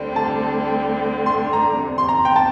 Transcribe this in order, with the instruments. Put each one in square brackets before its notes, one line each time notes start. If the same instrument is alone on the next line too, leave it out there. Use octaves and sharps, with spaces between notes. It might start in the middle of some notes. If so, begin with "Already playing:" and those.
Already playing: [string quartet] D2 D3 G3 C4
[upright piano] A5
C6
A#5
[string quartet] E2 C3 G3
[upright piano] C6
A#5
G5
A5